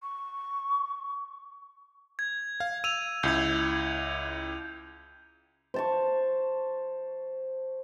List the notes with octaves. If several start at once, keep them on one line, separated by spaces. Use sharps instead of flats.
C#6
G#6
F5
E6 D#7 F7
C#2 E4 G6 G#6
C5 A5 C#6